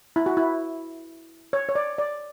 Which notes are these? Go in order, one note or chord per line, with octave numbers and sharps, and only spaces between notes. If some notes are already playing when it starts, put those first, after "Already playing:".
E4
F#4
E4
C#5
C#5
D5
D5